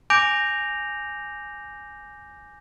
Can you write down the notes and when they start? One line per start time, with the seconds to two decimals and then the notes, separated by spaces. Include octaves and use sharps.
0.10 G#5 D6 G6 A#6 D7 F7